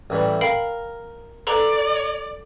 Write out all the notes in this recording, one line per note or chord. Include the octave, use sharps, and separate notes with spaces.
A1 E3 G3
A#4 F5 G5 B5
A4 B4 D5 A#5